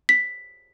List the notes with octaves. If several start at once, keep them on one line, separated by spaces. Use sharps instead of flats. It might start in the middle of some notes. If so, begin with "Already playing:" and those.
B6